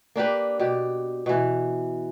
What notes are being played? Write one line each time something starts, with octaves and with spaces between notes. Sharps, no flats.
A#3 D4 G4 B4
B2 G4
B2 E3